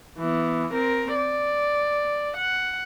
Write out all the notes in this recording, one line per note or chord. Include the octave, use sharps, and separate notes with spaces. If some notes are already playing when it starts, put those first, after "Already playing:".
E3 B3
C4 A#4
D5
F#5